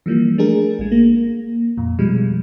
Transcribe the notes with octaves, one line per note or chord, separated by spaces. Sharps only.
E3 F3 G3 A#3
A3 D4 G#4 A#4
A1 G#3
A#3
F2 A#2
B2 F3 G3 G#3